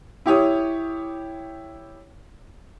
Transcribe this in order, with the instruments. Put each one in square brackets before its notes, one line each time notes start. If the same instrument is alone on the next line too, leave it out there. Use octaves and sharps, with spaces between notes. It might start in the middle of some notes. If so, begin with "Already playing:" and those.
[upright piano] E4 G4 C#5 D#6